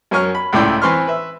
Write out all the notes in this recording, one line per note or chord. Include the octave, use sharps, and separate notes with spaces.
F#2 C#4 A#4 G#5 C#6 F6
B5
C#2 A2 E4 D5 G5 C6
E3 C4 B4 C6 C#6 F6
B4 E5